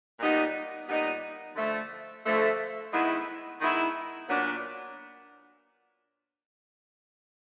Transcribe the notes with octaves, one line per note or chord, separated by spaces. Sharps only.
A#2 G3 B3 D#4
A#2 G3 B3 D#4
D3 F3 A3
D3 F3 A3
D#3 G#3 B3 E4
D#3 G#3 B3 E4
A#2 F#3 B3 D4